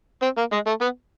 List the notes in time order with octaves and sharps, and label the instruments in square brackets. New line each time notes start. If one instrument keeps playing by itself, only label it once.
[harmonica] C4
A#3
G#3
A3
B3